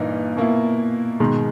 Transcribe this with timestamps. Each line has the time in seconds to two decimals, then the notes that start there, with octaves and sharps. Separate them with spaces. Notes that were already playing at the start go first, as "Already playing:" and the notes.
Already playing: G2 A#2 E3 A#3 D#4
0.37 B2 A#3 E4
1.20 G#2 B2 D#3 G#3